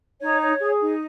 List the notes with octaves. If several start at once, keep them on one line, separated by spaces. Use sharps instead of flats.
D#4 C#5
C#5
G#4
D#4